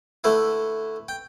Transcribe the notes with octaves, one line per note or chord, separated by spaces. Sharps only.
D3 A3 E4 B4
G5